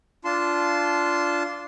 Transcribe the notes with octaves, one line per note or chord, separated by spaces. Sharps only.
D4 F4 A5 C6